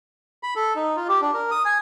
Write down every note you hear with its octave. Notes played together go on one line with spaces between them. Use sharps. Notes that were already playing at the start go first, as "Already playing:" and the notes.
B5
A4
D#4
F4
G4
D4
A#4
D#6
G#5